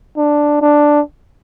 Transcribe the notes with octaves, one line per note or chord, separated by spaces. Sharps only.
D4
D4